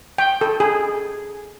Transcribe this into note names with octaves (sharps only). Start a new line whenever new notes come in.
G5
A4
G#4